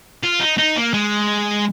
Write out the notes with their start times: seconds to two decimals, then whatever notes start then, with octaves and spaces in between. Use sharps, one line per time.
0.23 F4
0.40 D#4
0.58 D#4
0.76 A#3
0.94 G#3